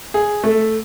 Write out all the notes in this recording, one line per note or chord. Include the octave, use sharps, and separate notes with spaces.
G#4
A3